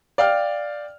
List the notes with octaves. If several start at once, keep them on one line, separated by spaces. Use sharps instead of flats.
D5 F5 G5 F6